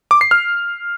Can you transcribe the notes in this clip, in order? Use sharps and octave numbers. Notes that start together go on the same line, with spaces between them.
D6
C7
F6